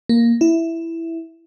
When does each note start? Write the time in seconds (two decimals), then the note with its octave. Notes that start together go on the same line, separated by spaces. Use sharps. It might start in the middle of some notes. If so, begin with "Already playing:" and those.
0.09 A#3
0.41 E4